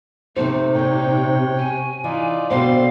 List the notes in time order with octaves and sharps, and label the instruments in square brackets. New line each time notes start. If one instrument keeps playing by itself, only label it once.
[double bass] C3 [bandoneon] A3 [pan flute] D#4 [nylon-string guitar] G4 C5
[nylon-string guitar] A#2 C4 [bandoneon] C#5 G5
[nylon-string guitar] G4 [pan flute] G#5
[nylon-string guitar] E3 [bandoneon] D#4 F4 D5
[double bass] B2 [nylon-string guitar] D3 G4 C5 [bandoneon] C4 D4 C6 [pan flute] F5